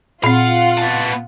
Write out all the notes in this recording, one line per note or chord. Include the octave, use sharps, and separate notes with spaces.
A#2 C4 F4 F5 F#5
B3 A5